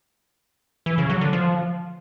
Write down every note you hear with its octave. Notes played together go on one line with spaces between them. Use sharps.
E3
C#3
F#3
D3
F3